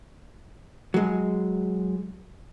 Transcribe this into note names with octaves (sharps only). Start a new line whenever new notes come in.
F#3 G#3